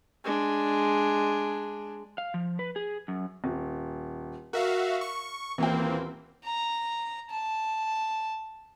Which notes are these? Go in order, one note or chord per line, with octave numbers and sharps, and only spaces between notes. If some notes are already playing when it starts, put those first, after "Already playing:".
G#3 D4
F5
F3
B4
G#4
F#2
D#1
F#4 A#4 E5 F5
C#6
D#1 E3 A#3 C4 G5
A#5
A5